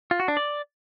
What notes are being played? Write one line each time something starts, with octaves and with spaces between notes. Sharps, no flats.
F4
F#4
D4
D5